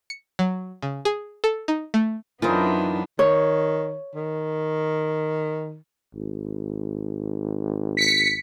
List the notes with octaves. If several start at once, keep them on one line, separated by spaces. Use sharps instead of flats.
C#7
F#3
C#3
G#4
A4
D#4
A3
F#2 E3 B3 D4 D#4 F4 A#4 C5
D#3 C#5
D#3
G#1
B6 C#7